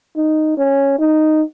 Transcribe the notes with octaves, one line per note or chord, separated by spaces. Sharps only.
D#4
C#4
D#4